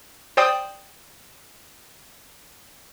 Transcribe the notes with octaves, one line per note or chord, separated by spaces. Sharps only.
C5 D5 G5 D#6